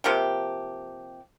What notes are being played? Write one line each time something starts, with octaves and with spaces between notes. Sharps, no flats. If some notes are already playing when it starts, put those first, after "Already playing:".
C3 F3 A#3 G4